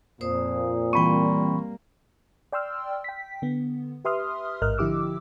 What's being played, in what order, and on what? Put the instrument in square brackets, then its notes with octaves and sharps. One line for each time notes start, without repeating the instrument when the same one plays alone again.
[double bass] F2 [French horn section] A#2 [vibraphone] C5 D#6
[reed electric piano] E3 B5 C#6 [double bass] G3 A#3 [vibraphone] C4 G5
[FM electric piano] D5 G5 C6 E6 F6
G5 B6
D3 B3
G4 B4 E5 C6 D#6 F6
A1 G#2 A#4 D#5 F6 F#6
D3 F3 E4 G4 D6 E6